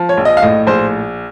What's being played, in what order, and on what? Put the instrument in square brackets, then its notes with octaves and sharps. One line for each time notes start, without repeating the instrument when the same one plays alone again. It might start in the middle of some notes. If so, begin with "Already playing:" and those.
Already playing: [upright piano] F3
C#5
A#1
D#5
F5
A2 D#5
A#1 C5